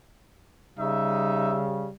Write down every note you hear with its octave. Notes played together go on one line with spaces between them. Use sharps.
C#3 G3 D#4 E5